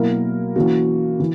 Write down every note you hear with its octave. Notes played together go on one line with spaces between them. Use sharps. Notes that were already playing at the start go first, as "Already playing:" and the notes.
Already playing: B2 F#3 A#3 E4 A#4
E3 A#3 C#4 F#4
E3